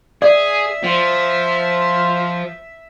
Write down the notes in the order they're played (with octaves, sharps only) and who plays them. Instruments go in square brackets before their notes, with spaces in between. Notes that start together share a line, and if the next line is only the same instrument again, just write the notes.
[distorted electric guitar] G#4 [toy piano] D5 [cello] E5
[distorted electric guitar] F3 [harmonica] F4 C5